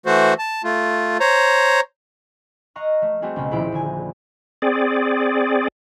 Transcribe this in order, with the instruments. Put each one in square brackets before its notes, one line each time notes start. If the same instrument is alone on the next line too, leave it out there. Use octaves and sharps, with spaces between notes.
[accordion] E3 A3 F#4 C5
A5
A3 F4
C5 C#5 A#5
[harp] D#5 F5 A#5 C#6 F6 F#6
A3
G3 A3 C4 F#4 G#4
C#2 B2 C#4
D#1 A#1 E4 C5 D7
D#1 D3 G#5
[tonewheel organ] C4 G#4 D5